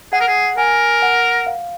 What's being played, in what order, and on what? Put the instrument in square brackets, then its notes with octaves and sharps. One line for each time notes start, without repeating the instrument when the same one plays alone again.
[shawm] G#4 [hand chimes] F#5
[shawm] A#4
G#4
[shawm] A#4 [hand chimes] G#5
[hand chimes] F#5
F5